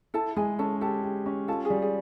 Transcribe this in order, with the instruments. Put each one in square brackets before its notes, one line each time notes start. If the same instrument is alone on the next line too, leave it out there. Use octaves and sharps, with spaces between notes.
[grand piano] E4 [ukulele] A4 A5
[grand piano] G#3 [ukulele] G#4 G#5
[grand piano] C#4 [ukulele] A4 A5
[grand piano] G4 [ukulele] A4 A5
[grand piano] G4
C#4
[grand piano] F4 [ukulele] A4 A5
[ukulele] G#4 G#5
[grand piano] G3
[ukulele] G#4 G#5